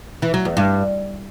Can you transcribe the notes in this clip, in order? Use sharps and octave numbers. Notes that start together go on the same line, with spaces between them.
E3
F#3
E2
G2